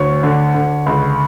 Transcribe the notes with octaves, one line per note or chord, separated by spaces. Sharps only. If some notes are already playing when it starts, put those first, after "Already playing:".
Already playing: D2 C#5
D3
D3
C#2